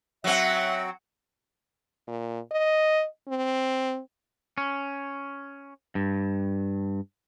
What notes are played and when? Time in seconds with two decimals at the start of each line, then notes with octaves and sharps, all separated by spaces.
0.24 F#3 C4 E5 F#5
2.07 A#2
2.51 D#5
3.28 C4
4.58 C#4
5.95 G2